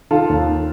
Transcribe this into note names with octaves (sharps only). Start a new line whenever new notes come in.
D#3 F4 A4
D#2